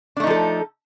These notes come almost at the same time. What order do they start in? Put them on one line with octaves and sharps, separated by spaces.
D4 A3 D#4 F3 A4